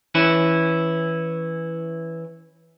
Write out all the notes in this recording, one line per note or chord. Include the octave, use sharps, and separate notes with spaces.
E3 C#4 E4